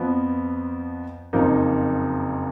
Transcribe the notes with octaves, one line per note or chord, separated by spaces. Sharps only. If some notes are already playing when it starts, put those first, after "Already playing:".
Already playing: F2 F3 B3
F#1 F2 F3 A#3 D#4